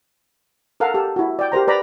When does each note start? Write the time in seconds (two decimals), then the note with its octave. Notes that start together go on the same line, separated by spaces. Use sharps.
0.80 A4 A#4 F5 F#5
0.94 G4 A4
1.16 E4 F#4
1.39 D5 G5
1.52 G4 A#4 C5 A#5
1.68 B4 D5 A#5 B5